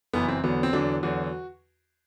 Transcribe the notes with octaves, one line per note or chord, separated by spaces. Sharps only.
F#1 F#2 E3 B3
C4
E2 D3 F#3 B3
C4
E2 D3 F#3 D4
E2 D3 F#3 F#4